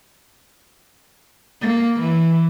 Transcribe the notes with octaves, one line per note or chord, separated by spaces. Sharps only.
A#3
E3